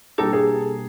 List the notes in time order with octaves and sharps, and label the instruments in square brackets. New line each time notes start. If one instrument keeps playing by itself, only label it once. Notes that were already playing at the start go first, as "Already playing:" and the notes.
[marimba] B2 G3 A#3 D4 G4 [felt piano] A4
[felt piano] G#4